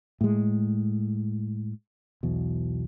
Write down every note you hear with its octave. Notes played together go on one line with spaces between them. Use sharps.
A2 G#3
B1 E2 B2